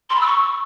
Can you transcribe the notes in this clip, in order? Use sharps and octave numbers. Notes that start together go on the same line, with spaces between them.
C6
B5
E6
C#6